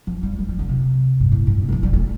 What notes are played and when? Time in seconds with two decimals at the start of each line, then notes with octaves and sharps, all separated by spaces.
0.07 F3
0.23 G3
0.39 G3
0.49 F3
0.59 D3
0.69 C3
1.20 G2
1.32 A2
1.47 G2
1.62 C3
1.69 G3
1.72 F3
1.83 G3
1.93 A3